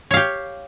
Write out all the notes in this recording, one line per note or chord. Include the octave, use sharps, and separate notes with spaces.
G4 C#5 F5